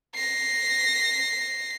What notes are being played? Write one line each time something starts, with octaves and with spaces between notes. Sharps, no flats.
A#6 C7